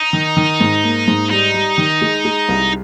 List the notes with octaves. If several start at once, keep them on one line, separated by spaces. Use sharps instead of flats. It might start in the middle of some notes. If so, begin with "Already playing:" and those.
Already playing: D#4
D#3
D#3
G#2
A#3
G#2
G3 D#4
G3
D#3
G#3
G#3
C2